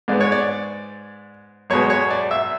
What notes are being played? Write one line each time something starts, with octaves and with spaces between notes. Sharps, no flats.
G#2 G#3 B3 D5
C#5
D5
B1 B2 G#3 B3 C#5
C#5
D5
E5